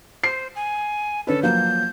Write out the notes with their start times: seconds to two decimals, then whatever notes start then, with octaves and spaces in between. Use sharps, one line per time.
0.24 C5 C7
0.55 G#5
1.27 D3 C#4 A4 B4
1.43 F3 F#3 A#3 G6